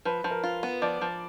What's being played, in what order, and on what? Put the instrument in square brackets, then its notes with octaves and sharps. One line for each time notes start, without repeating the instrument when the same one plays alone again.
[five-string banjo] F3 [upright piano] B4
[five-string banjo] F3
[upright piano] A#4
[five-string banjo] F4
B3
[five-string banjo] F3 [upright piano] D5
[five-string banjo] F3